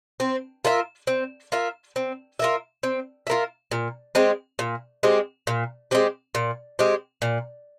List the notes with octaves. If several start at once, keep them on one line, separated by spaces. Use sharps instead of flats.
C4
F4 A#4 E5
C4
F4 A#4 E5
C4
F4 A#4 E5
C4
F4 A#4 E5
A#2
G#3 C4 G4
A#2
G#3 C4 G4
A#2
G#3 C4 G4
A#2
G#3 C4 G4
A#2